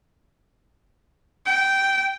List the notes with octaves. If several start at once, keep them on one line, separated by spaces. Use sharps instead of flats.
G5